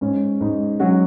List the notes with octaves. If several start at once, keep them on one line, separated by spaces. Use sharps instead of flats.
G#2 C#4
G#2 D#4
F#3 C#4 F#4